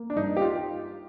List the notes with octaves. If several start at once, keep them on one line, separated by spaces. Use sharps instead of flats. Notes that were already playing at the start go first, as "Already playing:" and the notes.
Already playing: A#3
D4
G2 D#4
G4
F4